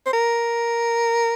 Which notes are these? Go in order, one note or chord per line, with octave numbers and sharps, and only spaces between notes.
C5
A#4